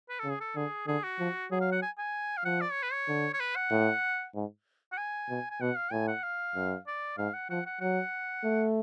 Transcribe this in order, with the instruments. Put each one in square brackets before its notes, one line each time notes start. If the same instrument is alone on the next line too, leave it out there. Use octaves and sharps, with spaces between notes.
[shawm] B4
[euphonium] C#3 [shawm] A4
[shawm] G#4
A4
[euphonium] D3 [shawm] G#4
[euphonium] D3 [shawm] G#4
[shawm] F#4
[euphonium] F3
[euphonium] F#3 [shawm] G#4
[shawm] F5
F#5
G#5
G#5
F5
[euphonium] F3 [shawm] F#5
[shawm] D5
C#5
B4
C#5
[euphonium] D3
[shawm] C#5
B4
F#5
[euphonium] A2
G#2
[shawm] F#5
G#5
[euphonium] B2
[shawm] G#5
[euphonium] B2 [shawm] F#5
[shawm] F5
[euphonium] A2 [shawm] G#5
[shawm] F#5
F5
[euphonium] F#2
[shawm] D5
[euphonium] G#2 [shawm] F5
[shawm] F#5
[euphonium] F3 [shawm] F#5
[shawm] F#5
[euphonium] F#3 [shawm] F#5
[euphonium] A3